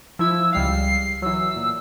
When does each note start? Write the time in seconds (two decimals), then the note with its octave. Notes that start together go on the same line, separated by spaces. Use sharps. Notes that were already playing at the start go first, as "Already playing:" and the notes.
0.19 F3 E4 E6 G#6
0.53 C#2 G3 F5 C7
1.22 E3 F#3 E6
1.56 A#2